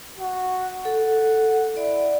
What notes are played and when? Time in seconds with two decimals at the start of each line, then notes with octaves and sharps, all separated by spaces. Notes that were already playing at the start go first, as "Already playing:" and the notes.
0.18 F#4
0.85 A4 F#5
1.77 E4 D5